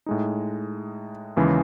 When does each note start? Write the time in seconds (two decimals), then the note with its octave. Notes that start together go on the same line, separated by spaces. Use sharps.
0.06 A2 G#3 D#4
1.37 D#2 C#3 E3 G#3